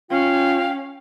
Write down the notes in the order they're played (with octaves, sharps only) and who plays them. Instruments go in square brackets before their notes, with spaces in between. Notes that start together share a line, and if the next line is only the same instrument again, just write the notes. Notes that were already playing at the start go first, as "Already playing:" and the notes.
[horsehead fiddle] C#4 [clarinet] F4 [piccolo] F5 [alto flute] G5